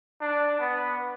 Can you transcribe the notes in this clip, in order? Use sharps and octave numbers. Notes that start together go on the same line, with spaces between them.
D4
B3